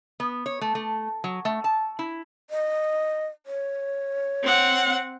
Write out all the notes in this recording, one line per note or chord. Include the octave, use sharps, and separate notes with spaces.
B3
C#5
A3
A3
F#3
A3
A5
E4
D#5
C#5
C4 F#5